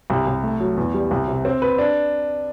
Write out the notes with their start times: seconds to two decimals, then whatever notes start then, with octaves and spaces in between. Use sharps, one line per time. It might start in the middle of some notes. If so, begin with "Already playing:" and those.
0.10 C2
0.27 C2
0.44 A3
0.60 F#3
0.77 E2
0.94 G3
1.11 C2
1.28 C3
1.45 C4
1.62 B4
1.78 D4